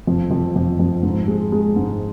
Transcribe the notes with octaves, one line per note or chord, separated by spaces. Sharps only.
F2
F2
F2
F2
G#2
G#3
G#3
G#2